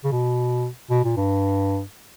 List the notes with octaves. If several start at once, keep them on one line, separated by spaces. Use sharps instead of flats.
C#3
B2
B2
A#2
G2